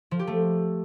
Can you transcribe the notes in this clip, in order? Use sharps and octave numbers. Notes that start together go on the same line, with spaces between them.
F3
G4
A3